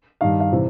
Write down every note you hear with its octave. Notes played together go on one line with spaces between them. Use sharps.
G2 D#3 F5
F5
C3 E3